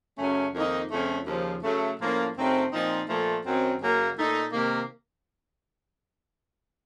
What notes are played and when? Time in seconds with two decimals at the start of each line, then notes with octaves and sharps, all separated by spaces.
0.18 F#2 C#3 A3 C#4
0.54 F2 D#3 A#3 D#4
0.91 F2 C#3 A3 C#4
1.26 D#2 C#3 F3
1.64 C#3 F#3 A3
2.00 A2 F3 A#3 C#4
2.36 F#2 C#3 A3 C4 D#4
2.72 A#2 F3 C4 D#4
3.08 A#2 F3 A3
3.45 F#2 D#3 F#3 C4
3.81 F#2 C#3 F#3 A#3
4.17 A#2 A3 D#4
4.53 C3 D#3 A#3